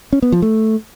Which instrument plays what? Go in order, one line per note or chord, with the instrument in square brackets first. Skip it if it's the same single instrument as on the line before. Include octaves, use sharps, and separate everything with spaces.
[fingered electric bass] C#4
B3
F3
A3